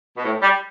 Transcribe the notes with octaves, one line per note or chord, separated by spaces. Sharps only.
B2
A2
G3